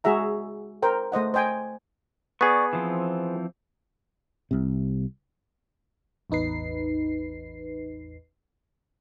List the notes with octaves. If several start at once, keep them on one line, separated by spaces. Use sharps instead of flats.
G#3 F#4 G#4 E5 A#5
A#4 C5 G5
A3 C5 D#5 F#5
C5 D#5 G5 G#5
B3 G#4 D5 C#6
E3 F3 C4
C2 C3
A1 E2 D#4 B4 C7